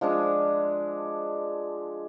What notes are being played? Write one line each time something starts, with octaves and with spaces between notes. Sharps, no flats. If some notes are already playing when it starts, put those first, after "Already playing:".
F3 G#3 D4